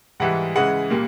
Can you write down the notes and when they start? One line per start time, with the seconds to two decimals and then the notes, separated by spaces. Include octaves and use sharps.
0.20 G#2 E3 G3 F#5
0.55 C#3 E3 G#3 F#5
0.90 A#2 G3 A#3